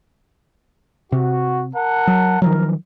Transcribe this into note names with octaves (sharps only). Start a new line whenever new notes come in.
C3 F#4
A#4 F#5 A5
F#3
D#3 F3 F#3 A#4